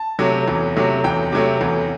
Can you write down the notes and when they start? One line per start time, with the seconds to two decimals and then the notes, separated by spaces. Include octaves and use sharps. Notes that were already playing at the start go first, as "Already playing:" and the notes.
Already playing: A5
0.19 C3 F#3 A3
0.48 E2
0.76 C3 F#3 A3
1.04 E2 G5
1.32 C3 F#3 A3
1.61 E2